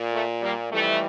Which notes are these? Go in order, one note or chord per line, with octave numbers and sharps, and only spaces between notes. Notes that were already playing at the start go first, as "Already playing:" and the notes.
Already playing: A#2
A3
G3 A#3
F2 E3 G3 A3